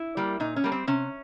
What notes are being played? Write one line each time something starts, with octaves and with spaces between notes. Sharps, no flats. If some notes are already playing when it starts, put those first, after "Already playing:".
Already playing: E4
G3 A#3
A#2 D#4
C#4
G3 A#3
C4
C3 C#4